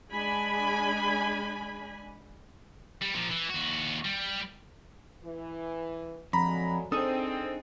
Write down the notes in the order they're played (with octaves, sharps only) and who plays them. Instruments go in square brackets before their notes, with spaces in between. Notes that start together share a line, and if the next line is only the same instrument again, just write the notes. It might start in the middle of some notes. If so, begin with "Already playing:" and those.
[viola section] G#3 D4 G#5 B5
[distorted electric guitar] G3
A#2 F3
E3
D#2 F#4
G3
[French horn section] E3
[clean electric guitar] F2 [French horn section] D3 F#3 G#3 [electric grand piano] A#5 B5
[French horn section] C4 [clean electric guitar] D4 D#4 G#4 [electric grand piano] A4 D#6